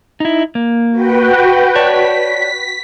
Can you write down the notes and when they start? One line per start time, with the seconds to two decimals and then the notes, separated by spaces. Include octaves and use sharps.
0.20 D#4 E4
0.55 A#3
0.91 F#4 B4 G5
1.75 C#5 D5 A5 B6